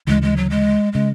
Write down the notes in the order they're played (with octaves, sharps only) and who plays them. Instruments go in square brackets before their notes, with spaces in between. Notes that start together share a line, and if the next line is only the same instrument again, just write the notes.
[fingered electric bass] D2 C#3 E3 [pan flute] G#3
[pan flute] G#3
F#3
G#3
[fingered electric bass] C#3 [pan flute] G#3